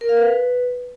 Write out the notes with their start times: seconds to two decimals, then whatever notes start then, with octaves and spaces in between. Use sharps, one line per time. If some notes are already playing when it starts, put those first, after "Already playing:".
0.01 A#4
0.09 F5
0.17 B4